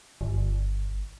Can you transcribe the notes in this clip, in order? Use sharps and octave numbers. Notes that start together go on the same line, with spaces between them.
G1